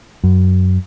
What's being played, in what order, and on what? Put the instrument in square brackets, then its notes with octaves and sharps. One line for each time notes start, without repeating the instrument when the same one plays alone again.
[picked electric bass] F#2